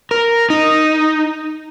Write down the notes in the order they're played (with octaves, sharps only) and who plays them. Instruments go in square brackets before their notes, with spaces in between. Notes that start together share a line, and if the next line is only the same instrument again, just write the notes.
[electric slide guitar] A#4
D#4